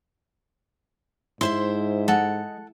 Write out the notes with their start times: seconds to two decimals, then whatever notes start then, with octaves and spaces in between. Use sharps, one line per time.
1.41 G#2 E4 C5 E5 C6
2.08 G#3 A4 F#5